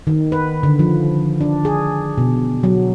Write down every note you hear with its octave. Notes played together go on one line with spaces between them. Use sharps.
D#3
B4
D3
F3
D4
G#4
B2
F#3